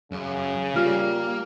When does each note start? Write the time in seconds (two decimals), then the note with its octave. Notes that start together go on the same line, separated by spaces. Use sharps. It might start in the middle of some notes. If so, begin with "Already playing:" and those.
0.12 F#2 C#3 C#4
0.75 G3 A#3 F4 F6